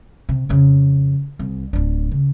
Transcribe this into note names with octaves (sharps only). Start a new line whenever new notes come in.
C3
F2 C#3
C2
D1 D4
C#3